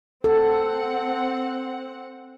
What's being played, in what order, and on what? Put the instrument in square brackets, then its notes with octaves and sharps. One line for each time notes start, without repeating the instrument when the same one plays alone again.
[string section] C4 F#5 [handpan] A4